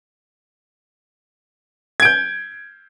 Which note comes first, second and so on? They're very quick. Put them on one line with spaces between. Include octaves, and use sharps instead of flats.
G#6 D7 G6